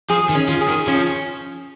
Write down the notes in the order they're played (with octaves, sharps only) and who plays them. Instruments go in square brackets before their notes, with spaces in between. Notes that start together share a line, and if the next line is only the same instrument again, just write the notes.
[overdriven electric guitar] F3 [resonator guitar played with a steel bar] G#4
[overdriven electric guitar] D#3
[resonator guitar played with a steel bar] C#4
[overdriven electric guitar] F3
[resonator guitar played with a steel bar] G#4
[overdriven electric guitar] D#3
[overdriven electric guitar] F3 [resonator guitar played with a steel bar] C#4